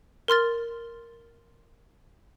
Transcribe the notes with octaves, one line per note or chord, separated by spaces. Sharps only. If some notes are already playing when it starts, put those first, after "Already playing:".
A#4 C6 F6 A6